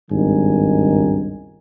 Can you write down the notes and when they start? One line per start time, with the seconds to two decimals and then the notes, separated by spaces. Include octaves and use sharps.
0.11 G#1 C#2 G2 D#3 G#5